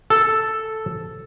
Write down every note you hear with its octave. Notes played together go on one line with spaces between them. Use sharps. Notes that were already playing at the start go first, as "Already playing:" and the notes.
A4